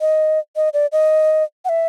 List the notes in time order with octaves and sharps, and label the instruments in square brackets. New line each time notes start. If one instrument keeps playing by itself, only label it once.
[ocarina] D#5
D#5
D5
D#5
F#5
E5